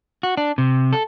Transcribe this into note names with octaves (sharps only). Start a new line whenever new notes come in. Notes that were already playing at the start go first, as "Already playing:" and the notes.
F#4
D4
C3
A4